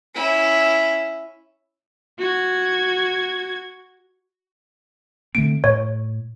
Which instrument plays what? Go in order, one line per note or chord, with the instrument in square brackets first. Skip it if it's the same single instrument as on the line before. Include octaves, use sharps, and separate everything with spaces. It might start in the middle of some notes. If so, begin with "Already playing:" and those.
[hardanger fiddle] C#4 E4
[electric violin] F#4 G#6
[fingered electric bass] D3 A3 C4 [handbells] D7
[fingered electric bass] A2 [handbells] C#5